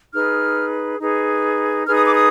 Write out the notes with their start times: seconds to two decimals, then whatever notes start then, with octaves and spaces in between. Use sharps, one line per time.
0.13 D#4 G#4 B4 F6
0.99 D#4 G#4 B4
1.86 D#4 G#4 B4 F6
1.96 D#6
2.05 D6
2.14 D#6